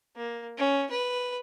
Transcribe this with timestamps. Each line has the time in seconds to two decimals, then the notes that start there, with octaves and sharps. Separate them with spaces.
0.16 A#3
0.57 C#4
0.91 B4